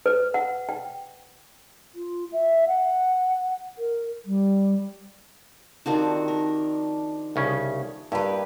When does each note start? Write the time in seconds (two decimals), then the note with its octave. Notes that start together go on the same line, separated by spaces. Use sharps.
0.06 B4
0.34 F#5
0.69 G5
1.95 F4
2.32 E5
2.68 F#5
3.78 A#4
4.25 G3
5.86 D#3 F3 C4 D4 F#4 G4
6.28 A#4
7.36 C2 C#3 C#4
8.12 G2 A#3 E4 G4 B4 D#5